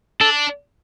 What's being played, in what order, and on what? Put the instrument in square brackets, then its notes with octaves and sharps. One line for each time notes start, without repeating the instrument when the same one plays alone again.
[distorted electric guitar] D4 [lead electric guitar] A4